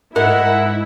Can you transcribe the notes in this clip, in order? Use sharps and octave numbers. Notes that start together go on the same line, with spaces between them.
G#2 E4 A#4 F#5